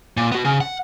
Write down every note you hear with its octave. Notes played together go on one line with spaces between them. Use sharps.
A#2
B3 F#4
C#3
F#5